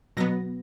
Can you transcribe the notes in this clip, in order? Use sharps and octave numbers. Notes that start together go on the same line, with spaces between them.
B2 F#3 B3 A#6